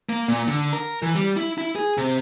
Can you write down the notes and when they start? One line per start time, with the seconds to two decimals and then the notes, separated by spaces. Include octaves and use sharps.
0.09 A#3
0.28 A#2
0.48 D3
0.73 A#4
1.02 E3
1.16 G3
1.37 E4
1.58 E4
1.75 G#4
1.98 C3